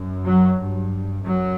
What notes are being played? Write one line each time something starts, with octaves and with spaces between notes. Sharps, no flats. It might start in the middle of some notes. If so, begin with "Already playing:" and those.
Already playing: F#2
F#3
G2
F#2 F#3